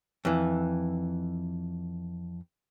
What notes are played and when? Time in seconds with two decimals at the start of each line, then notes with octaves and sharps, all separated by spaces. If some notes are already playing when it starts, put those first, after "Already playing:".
0.25 F2 E3